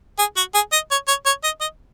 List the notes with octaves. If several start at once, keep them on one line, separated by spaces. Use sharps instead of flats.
G#4
F#4
G#4
D#5
C#5
C#5
C#5
D#5
D#5